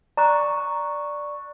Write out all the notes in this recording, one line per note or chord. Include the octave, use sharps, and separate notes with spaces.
D5 A#5 C#6 F#6